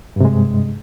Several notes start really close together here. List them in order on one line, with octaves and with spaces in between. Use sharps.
G2 C3 G#3